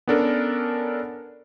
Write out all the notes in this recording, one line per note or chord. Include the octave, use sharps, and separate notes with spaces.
B3 C#4 D4 A4 A#4